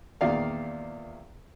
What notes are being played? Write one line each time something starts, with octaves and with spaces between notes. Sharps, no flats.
E2 A#2 D#3 D5 F5